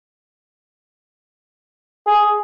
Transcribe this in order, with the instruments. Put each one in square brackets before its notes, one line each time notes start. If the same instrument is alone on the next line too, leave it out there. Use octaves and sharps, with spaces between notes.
[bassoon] G#4